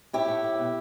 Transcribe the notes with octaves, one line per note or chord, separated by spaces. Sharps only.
A2 E4 G4
A2
A2
B2